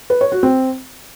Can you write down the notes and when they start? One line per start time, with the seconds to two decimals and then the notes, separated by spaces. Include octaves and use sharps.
0.10 B4
0.21 C#5
0.32 F#4
0.43 C4